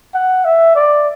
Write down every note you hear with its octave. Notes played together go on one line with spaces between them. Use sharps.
F#5
E5
D5